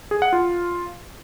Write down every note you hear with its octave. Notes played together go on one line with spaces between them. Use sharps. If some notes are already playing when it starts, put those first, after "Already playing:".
G#4
F#5
F4